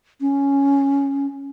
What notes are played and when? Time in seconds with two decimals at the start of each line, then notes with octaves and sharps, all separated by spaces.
0.21 C#4